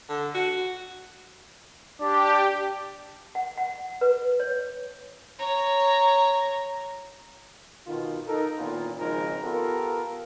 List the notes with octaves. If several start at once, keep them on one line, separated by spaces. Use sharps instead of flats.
D3
F#4
D4 G4
F#5
F#5
B4
C#5
C#5 A#5
B2 D#3 F4
D#4 A4 A#4
A#2 D#3 E3 B3 C#4 F4
G#1 C#3 F3 G#3 D#4 A#4
B3 F4 G4 A4 A#4